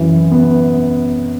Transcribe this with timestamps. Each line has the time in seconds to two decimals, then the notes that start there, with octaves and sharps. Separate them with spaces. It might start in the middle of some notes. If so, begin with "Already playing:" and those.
Already playing: F#2 E3
0.31 B3